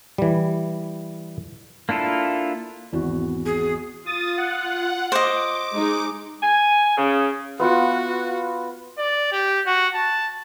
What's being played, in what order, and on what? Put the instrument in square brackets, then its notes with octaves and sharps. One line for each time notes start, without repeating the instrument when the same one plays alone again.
[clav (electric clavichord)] E3 G3
[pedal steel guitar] A#3 D4 E4 F4 A4
[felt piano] G#1 E2 F#4
[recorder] G#4
[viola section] F4 [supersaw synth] D#6 A6
[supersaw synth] F#5
[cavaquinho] C5 D#5 [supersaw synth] D6
[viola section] G#3 D#4
[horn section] G#5
C#3
[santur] B3 F4 F#5 [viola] F#4
[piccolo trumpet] D5
G4
F#4
A5